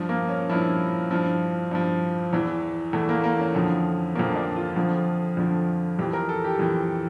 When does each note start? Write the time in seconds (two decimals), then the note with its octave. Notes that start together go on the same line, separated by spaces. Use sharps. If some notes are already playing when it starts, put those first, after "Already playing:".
Already playing: G2 F3
0.09 A#3
0.29 C#4
0.49 G2 F3 E4
1.11 G2 F3
1.71 G2 F3
2.33 E2 E3
2.93 E2 E3 A3
3.09 A#3
3.24 A#3
3.39 C#4
3.54 F2 D3 F3
4.15 F2 D3 F3 A#3
4.36 D4
4.56 F4
4.76 F2 D3 F3
5.37 F2 D3 F3
5.99 F2 E3 G4
6.13 A#4
6.29 A4
6.44 G4
6.59 F2 E3